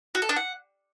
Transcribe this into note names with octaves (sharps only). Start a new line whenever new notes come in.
F#4
A4
D4
F#5